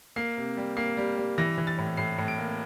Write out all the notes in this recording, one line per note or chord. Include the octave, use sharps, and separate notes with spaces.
A#3 C7
C3
G3
A#3 C7
G3
G3
E3 A#6
E3
A6
A2
A2 C7
A2
D7
A#3